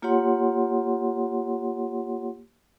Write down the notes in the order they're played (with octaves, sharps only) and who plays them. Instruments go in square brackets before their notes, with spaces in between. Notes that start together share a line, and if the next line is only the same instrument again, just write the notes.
[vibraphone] A#3 F4 G4 C#5 F#5 C6